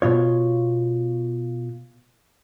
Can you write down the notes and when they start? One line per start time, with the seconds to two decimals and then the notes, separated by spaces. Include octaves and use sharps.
0.02 B2 F4 C#5